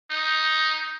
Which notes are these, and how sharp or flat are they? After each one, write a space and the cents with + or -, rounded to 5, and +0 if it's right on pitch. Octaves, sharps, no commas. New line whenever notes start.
D#4 +5